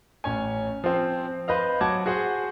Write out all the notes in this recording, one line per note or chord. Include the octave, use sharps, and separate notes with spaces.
A1 C#4 C#5 G#5
F3 C4
B4 C5 D#5 F5
F#3 F#5 A5 D6 G#6
F#4 G#4 C5 F#5